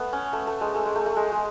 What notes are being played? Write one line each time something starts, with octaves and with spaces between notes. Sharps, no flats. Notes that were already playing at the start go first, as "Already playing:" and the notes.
Already playing: A3 B3
C#4
A3
A3
G#3
A3
G#3
A3
A3
G#3
G#3